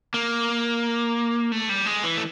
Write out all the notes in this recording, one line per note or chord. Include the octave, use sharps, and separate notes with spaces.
A#3
A3
G3
G#3
E3
A3